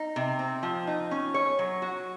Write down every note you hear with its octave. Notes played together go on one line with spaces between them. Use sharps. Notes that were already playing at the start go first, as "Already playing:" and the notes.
Already playing: D#4
C3
C4
F3
D#4
C#4
C#5
F#3
F#4